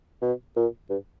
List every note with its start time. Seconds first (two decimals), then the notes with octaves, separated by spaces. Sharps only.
0.22 B2
0.56 A#2
0.90 G2